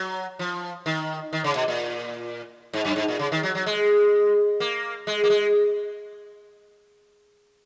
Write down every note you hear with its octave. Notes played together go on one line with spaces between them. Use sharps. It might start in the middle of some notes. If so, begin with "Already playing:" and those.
Already playing: F#3
F3
D#3
D#3
C#3
B2
A#2
G#2
F#2
G#2
A#2
C#3
D#3
F#3
F#3
G#3
A#3
G#3
A#3
G#3